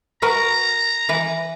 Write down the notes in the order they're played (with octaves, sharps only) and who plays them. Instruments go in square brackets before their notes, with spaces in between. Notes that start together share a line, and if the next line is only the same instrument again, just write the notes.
[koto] F#4 A#4 B4 [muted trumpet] A#5
[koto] E3 B4